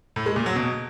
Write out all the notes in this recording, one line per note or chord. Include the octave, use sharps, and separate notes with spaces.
A2
G#3
A#2
F#3
B2